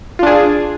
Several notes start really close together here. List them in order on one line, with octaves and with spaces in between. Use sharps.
F4 D4 G#4